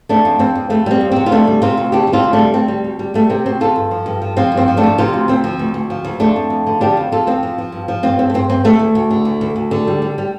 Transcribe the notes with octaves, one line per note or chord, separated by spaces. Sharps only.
F2 A3 D4
F2
F2 C4
F2
F2 A3
G3 C4
F2
C3 C4
F4
D2 A3 D4
G3
C3 C4 F4
D2
D2 D4 G4
G3
C4 F4
D2
A3 D4
G3
D2 C4
G3
D2
G3
G3 A3
C3 C4
D2 C4
D2 F4 A4
G2
F3
G2
F3
F3 C4 F4
G2
C4
F3
A3 D4
F3
C3 C4 F4
D2
D2 C4
F3
D2
D2
F3
D2
F2 A3 D4
F2
F2
D3
F3 D4 G4
F2
F2 F4 A4
F2 C4 F4
F3
F3
G2
F3
G2 C4 F4
G2 C4
A3
G2 C4
G2 C4
D2 A3
D2
D2
D3
D2
D2
D2
D3
G3
G3
G3